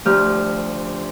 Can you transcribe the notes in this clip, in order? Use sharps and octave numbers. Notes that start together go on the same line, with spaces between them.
D2 F3 A3 G4 F6